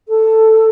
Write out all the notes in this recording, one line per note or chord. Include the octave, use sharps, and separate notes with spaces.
A4